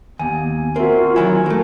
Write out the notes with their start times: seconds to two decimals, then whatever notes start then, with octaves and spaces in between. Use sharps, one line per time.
0.19 D#2 B3 G#5
0.48 A#3
0.76 C4 F#4 A#4 E5
0.98 F4
1.16 D#3 F#3 E4 G#5
1.46 A3 A#3